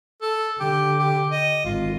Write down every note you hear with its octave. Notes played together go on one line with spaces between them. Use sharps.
A4
D3 G4
G4
D#5
G#1 F4